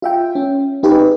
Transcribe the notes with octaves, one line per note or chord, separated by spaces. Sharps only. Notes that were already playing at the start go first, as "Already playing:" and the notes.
F4 E5 G5
C#4
C4 D#4 G4 G#4 B4